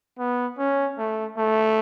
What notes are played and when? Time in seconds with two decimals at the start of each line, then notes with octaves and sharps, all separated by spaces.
0.19 B3
0.59 C#4
0.98 A3
1.38 A3